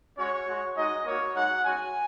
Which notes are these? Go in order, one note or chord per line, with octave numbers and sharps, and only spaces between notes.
G#3 C#4 F#4 C#5
G#3 F#4
G#3 D#4 F#4 D#5
A#3 F#4 C#5
G#3 D#4 F#4 F#5
G#3 C#4 F#4 G#5